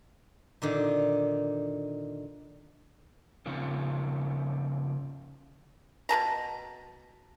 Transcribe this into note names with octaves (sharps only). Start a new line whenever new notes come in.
A#2 D3 D#3
C#3 F3 A#3 C4
B2 B4 A5 A#5